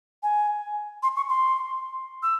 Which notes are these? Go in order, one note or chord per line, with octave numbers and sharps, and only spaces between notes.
G#5
C6
C#6
C6
E6